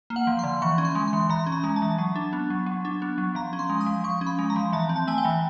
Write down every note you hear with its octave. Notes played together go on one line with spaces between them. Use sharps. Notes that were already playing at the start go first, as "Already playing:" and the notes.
A#3
F#5
F3
D3 C6
E3 C#6
C#4
C6
G#3
C6
E3
E3 A#5
C#4
A#5
G#3
A5
E3
F#3
D4
B3
F#3
F#3
D4
B3
F#3
F3 A#5
C#4
C6
G#3
D#6
F3
F3 C#6
C#4
B5
G#3
A#5
F3
E3 A5
C4
A5
A3 G#5
G5
E3